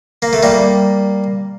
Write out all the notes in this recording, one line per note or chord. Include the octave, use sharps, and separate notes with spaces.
A#3
A3
G3 A#3